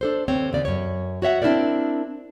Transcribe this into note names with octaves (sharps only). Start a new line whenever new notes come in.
D4 A4 C5
D#2 C4 C#5
D#2 C#3 D5
F#2 C#5
F#4 C#5 E5 F#5
C4 D4 E4 G4 A#4 D5